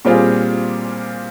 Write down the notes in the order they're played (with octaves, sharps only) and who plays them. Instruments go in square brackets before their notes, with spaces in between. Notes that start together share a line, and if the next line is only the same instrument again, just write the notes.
[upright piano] A#2 G3 C4 F4 G#4